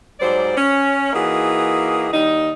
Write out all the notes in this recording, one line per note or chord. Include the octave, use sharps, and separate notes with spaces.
G#2 F#3 G3 C5 D5
C#4
E3 A#3 D#4 F#4 G#4
D#2 G3 D#4